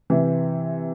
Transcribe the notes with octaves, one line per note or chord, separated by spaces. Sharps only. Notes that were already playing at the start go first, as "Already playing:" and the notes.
C3 E3